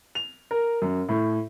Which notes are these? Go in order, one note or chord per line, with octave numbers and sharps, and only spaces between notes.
F7
A#4
F#2
A2